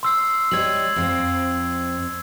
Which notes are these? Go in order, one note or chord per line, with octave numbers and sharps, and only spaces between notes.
C6 E6 C7
G3 C#5 D#5 G#6 F#7
F2 C4